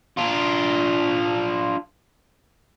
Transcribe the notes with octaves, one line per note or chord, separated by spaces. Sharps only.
D4 F4